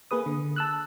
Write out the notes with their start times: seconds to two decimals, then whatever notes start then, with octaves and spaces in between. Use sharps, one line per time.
0.11 A#3 G#4 B4 D#6
0.26 D3
0.56 A5 E6 F#6